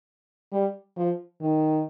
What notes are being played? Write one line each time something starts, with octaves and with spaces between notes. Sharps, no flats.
G3
F3
D#3